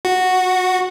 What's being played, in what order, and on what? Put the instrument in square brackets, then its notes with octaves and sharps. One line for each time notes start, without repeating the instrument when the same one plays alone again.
[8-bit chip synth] F#4